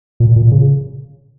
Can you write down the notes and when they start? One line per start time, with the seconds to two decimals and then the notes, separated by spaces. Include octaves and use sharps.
0.20 A#2
0.36 A#2
0.52 C#3